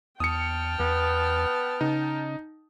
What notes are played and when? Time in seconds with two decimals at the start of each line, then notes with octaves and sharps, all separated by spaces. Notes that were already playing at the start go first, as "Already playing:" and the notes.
0.20 E2 G5 A5 D#6 F6 C#7
0.80 E2 B3
1.81 C#3 D#4